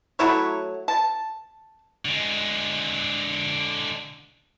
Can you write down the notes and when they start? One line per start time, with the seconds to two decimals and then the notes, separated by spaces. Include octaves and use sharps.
0.19 F#3 A3 E4 C#5
0.88 A5
2.05 D3 G#3